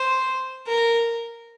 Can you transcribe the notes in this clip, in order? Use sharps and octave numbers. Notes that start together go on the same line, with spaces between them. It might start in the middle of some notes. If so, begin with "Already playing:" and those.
Already playing: C5
A#4